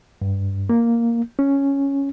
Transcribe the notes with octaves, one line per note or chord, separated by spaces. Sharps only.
G2
A#3
C#4